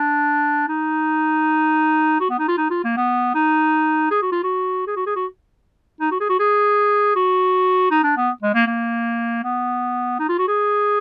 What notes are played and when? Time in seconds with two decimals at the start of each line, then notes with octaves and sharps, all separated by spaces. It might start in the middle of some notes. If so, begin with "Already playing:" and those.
Already playing: D4
0.68 D#4
2.20 F#4
2.30 B3
2.39 D#4
2.48 F4
2.58 D#4
2.70 F4
2.84 A#3
2.97 B3
3.35 D#4
4.11 G#4
4.22 F#4
4.32 F4
4.44 F#4
4.87 G#4
4.96 F#4
5.06 G#4
5.16 F#4
6.00 D#4
6.11 F#4
6.20 G#4
6.29 F#4
6.40 G#4
7.16 F#4
7.91 D#4
8.04 D4
8.17 B3
8.42 G#3
8.54 A#3
8.67 A#3
9.44 B3
10.19 D#4
10.29 F4
10.39 F#4
10.48 G#4